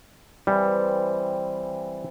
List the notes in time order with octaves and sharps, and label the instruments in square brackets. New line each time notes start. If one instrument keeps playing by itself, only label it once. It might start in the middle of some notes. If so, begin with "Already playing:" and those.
[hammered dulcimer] E3 C4 [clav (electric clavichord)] G3